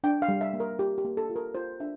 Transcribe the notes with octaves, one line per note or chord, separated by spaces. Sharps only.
D4 G5
F5
G3
E5
A#3
A#4
F4 G4
G4
A#3
A4
F4
A#4
F4 C5
D4 E5